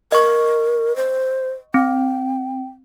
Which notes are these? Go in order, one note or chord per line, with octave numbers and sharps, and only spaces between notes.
A#4 D#5 C#6
C5
C4 G5